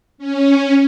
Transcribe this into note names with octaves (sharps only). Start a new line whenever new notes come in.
C#4